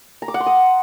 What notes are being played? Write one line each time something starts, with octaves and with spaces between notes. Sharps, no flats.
A#5
D6
F#5
C6
D#6